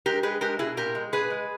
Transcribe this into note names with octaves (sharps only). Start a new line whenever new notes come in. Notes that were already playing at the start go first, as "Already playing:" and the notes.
G#3 G4 A#4
G#3 G#4 B4
G#3 G4 A#4
B2 E4 G#4
A#2 G4 A#4
G#3
A#2 G#4 B4
G#3